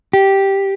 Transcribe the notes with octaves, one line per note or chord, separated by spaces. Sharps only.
G4